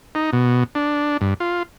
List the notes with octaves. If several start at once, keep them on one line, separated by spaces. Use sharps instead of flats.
D#4
B2
D4
G2
F4